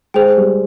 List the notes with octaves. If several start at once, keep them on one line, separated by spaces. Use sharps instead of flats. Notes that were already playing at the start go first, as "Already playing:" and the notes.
G#3 G#4 C5 G5
G3